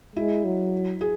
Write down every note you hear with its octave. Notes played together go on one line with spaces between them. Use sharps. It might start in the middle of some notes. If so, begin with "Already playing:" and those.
G#3 E4
F#3
G#4